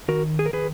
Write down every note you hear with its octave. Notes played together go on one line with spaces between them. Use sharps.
D#3 F#4 A#4
G#4
A#4
D#3 G#4 B4